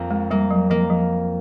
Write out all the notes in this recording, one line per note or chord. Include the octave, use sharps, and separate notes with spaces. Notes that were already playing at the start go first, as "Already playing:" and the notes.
Already playing: F2 A#3
G#3
G3 A#3
F#3
F3 A#3
F3